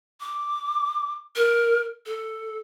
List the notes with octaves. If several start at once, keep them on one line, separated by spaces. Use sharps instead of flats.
D6
A#4
A4